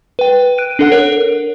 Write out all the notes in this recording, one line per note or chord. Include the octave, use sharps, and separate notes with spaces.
B4 G5
F#6 D7 D#7
D4 A4 F#5 F#6
A#4 C#5